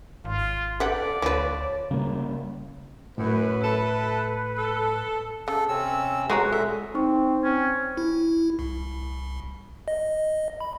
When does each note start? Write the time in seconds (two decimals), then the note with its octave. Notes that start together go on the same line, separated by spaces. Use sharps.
0.25 G#1 F4
0.80 A4 B4 D5 F#5 G5
1.22 D2 F3 B4 C#5
1.91 C#3 G3 A#3
3.18 F#2 A2 B4
3.61 E4 A4
4.57 A4
5.48 C#3 A4
5.69 C3 C4 C#4 E6
6.30 G#3 F#4 B4 C#5 F#5 A#5
6.52 A#2 A4 E5
6.95 C4 D#4 C#6
7.44 C4 C#4
7.97 E4
8.59 C2
9.88 D#5
10.61 B5